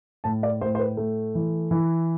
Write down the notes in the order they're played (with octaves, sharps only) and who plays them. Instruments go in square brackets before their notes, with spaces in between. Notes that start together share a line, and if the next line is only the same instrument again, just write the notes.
[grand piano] A2 A5
D5
A2 C5
C5
B4
A3
E3
E3